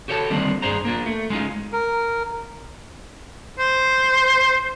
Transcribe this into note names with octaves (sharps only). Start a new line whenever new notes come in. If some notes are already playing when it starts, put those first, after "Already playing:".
F#4 G4 A4 C#5 D5 A5
D3 D#3 G3 A#3 C4 D4
G2 D4 G#4 C5 A#5
A#3 D4 F4
A3
G#3 C#4 D#4 F4
A#4
C5